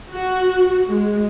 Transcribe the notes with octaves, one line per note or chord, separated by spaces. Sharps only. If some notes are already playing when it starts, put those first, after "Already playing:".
F#4
G#3